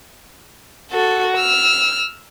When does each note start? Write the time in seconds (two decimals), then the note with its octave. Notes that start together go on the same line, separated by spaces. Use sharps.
0.91 F#4 A4
1.36 E6 F6